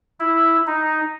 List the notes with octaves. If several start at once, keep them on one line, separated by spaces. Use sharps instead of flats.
E4
D#4